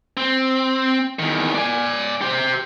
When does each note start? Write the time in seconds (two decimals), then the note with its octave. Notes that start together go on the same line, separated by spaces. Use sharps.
0.17 C4
1.19 E2 D#3
1.55 D5 G#5
2.21 G4 C5